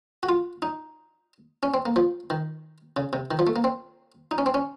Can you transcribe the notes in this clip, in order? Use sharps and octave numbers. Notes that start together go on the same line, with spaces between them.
F#4
F4
D#4
C#4
C4
A#3
F3
D#3
C#3
C3
D#3
F3
A3
A#3
C4
D#4
C#4
C4
C#4